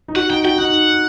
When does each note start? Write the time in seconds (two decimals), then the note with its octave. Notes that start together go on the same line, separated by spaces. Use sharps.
0.08 D#4
0.16 F#4 F#5
0.30 D#4 G5
0.44 F#4 G5
0.58 D#4 F#5